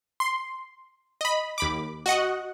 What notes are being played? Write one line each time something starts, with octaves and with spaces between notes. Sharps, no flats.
C6
D#5 B5
D#2 B5 D6
F#4 D#5 F#5